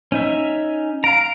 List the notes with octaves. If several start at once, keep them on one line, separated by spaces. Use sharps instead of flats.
C#4 D#4 E5
F5 A#5 D7